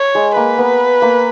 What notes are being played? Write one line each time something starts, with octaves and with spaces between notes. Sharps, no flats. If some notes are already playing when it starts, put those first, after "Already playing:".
Already playing: C#5
G#3
A#3 B4
B3
A#3